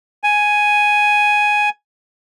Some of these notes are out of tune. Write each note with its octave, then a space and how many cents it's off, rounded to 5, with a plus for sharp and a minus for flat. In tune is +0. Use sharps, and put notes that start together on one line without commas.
G#5 +5